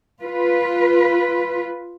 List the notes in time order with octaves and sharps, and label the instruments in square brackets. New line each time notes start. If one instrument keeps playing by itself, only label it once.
[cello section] F4 B4